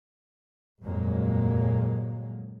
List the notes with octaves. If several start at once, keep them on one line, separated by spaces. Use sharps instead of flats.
G1 F2 A#2 F#3 G#3 A#3